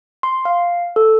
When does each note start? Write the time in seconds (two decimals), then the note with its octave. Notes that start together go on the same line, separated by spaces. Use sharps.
0.23 C6
0.45 F5
0.96 A4